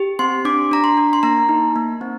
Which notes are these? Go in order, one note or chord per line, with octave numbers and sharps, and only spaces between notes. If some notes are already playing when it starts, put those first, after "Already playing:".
Already playing: G4
C4 C6
D4 D6
D4 A#5
C6
D4
C6
A#3 A#5
D#4
A#3
C4